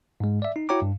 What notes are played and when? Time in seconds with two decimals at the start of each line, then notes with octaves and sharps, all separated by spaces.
0.20 G#2 G#3
0.42 D5 E5
0.56 D#4
0.69 E4 F#4 C#5 G5 A#5 D6
0.82 G2